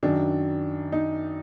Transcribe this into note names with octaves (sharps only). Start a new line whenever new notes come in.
F#2 D#3 F#3 D4
D#4